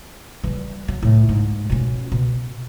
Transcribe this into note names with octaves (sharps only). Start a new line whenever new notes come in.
E3 G3
F#3
A2 E3
G#2
B2 C#4
B2